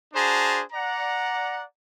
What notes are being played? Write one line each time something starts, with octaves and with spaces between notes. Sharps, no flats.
D4 F#4 G#4 C5 A5 A#5
D5 F#5 A#5